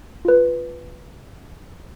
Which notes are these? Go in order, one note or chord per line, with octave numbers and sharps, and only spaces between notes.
F4 B4